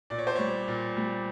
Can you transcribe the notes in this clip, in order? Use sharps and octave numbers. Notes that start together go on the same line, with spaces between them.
A#2 D5
C#5
C5
G3 C#5
A#2
G3